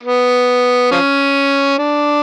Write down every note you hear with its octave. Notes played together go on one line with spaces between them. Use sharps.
B3
F3 C#4
D4